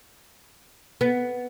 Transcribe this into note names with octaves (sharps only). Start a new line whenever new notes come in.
B3